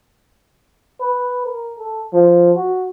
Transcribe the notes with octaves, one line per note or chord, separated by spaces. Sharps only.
B4
A#4
A4
F3
F#4